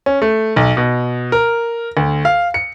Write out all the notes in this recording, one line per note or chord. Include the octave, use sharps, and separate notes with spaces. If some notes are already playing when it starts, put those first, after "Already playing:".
C#4
A3
B1
B2
A#4
D2
F5
C#7